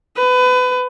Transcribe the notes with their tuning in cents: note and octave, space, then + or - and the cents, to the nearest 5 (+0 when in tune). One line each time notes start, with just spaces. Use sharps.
B4 +25